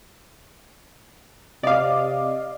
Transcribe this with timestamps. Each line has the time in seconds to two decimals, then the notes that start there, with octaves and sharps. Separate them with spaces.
1.63 C3 D5 D#5 F5 D6